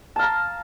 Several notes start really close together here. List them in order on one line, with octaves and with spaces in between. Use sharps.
A5 F5 A#5